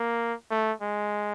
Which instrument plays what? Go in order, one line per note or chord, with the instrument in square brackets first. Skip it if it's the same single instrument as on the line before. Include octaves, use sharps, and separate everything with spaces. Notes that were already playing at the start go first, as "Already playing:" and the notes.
Already playing: [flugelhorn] A#3
A3
G#3